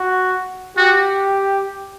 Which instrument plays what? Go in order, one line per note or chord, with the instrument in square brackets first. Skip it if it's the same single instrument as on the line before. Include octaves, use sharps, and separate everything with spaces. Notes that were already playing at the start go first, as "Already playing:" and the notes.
Already playing: [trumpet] F#4
[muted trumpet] F#4 [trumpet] G4